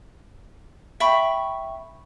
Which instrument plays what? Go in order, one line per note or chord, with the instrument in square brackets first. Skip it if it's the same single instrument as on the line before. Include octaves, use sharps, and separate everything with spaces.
[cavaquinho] E5 G5 B5 C#6